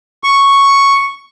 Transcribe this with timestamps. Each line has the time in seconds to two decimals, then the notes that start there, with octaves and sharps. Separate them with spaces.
0.24 C#6